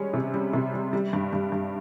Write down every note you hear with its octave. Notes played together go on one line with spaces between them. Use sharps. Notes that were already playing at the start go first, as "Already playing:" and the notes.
Already playing: G3 G#3 C#4
C3
G3
C3
G3
G3
G2
G2
G2